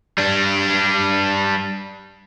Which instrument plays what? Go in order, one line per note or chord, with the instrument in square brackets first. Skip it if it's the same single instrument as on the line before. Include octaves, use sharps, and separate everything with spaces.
[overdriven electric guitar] G3 D4